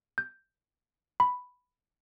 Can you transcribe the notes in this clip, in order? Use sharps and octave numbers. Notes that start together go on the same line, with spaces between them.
G6
B5